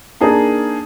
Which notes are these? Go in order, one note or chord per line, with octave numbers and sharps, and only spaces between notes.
A#3 D4 D#4 G#4 A#4 A5